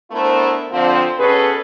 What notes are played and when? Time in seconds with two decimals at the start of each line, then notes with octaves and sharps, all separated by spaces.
0.11 A3 B3 D4 E4 A#4 C5
0.71 D3 F3 C4
1.17 B2 C#4 G#4 A4 B4